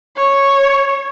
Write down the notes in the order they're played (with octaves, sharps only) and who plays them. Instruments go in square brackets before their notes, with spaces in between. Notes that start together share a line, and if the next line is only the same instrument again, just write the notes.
[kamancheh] C#5